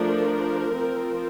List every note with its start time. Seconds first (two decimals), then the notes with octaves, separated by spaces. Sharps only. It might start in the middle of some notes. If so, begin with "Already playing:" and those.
Already playing: F3 A3 D4 A#4
0.73 F3 C4